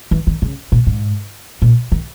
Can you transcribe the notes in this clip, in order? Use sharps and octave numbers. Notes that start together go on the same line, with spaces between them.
E3
D#3
C#3
A#2
G#2
A#2
D#3